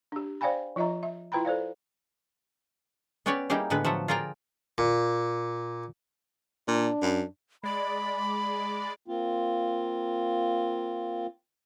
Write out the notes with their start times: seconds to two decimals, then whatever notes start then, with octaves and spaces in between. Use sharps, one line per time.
0.12 D4 G4
0.41 C5 D5 F5 G5 G#5 B5
0.76 F3 F4 D#5 E5 A#5
1.03 E5
1.32 E4 F4 B4 G5 A#5 B5
1.45 A4 C5 D5 F5
3.26 B3 C#4 G4 B4 C#5 D5
3.50 G3 A#3 D#4 E4 G4 G#4
3.70 A2 D3 G#3 B3 B4
3.85 F3 F#3 A4 E5 F#5
4.08 F4 G#4 A#4 D5 G5 A#5
4.78 A#2
6.68 A#2 D4
7.02 F#2
7.63 G#3 D5 B5
9.08 A#3 C4 F4